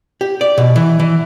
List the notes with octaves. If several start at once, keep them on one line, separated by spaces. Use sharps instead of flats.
G4
D5
B2
E3
E3